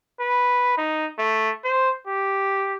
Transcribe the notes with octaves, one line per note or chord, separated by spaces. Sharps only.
B4
D#4
A3
C5
G4